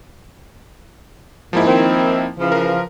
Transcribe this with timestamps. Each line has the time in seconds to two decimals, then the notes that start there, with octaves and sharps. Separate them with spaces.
1.53 G#2 F3 A#3 E4
1.66 D#3 C4
2.39 C#3 E3 F3
2.52 A#4 B4